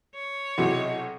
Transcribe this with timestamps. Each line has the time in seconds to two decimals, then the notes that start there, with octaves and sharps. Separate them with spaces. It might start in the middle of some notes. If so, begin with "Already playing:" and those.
0.15 C#5
0.58 B1 C3 E4 F#4 G#4 D#5